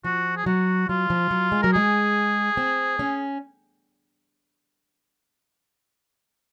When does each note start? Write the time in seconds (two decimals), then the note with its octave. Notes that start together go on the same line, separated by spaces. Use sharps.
0.04 F3 F#4
0.37 G#4
0.46 F#3 F#4
0.89 F#3 F4
1.10 F3
1.31 F#3
1.52 G#3
1.62 F#3 A#4
1.73 G#3 G#4
2.57 C4
2.99 C#4